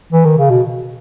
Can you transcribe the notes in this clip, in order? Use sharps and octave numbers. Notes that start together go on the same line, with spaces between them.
E3
D#3
C#3
B2